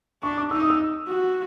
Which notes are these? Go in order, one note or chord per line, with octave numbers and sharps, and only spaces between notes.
D4 C#6
D6
D#4 E6
D#6
E6
F#4